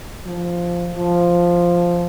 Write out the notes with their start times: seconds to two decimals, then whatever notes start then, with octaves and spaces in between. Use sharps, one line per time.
0.26 F3
0.95 F3